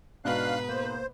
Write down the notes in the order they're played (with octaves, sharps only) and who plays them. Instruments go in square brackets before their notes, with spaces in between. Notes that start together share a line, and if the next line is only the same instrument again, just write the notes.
[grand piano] G#2 B2 [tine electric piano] D4 D#4 F#4 [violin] B4 [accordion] F5 F#6
[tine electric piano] A#3 [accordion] C5